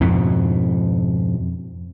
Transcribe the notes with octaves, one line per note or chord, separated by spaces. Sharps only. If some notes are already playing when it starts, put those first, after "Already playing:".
F2 G#2 B2